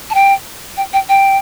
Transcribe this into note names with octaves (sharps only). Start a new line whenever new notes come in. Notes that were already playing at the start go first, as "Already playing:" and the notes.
A5
G5
G5
G5
G5